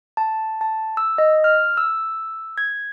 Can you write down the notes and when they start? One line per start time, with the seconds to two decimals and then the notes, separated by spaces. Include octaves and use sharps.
0.17 A5
0.61 A5
0.97 E6
1.18 D#5
1.44 F6
1.77 E6
2.58 G#6